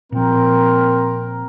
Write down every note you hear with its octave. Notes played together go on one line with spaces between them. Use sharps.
A#2 F3 C4 A#4